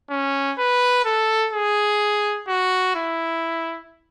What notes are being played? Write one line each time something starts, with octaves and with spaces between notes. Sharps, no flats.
C#4
B4
A4
G#4
F#4
E4